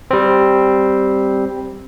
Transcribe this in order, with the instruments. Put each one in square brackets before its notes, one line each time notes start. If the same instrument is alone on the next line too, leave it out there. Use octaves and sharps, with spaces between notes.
[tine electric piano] G3 C4